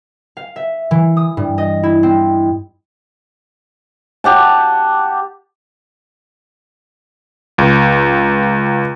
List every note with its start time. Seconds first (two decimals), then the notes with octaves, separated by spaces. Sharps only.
0.37 F5
0.56 E5
0.91 E3
1.17 D#6
1.37 G2
1.58 D#5
1.83 E4
2.03 C4
4.24 G4 F#5 A5
7.58 C#2